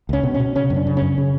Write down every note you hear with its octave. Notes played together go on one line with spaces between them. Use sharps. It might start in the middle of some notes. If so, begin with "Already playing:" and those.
C#2 C#4
B2
C#4
B2
C#3 C#4
F#2
D4
C#3
C#4
F#2
C#3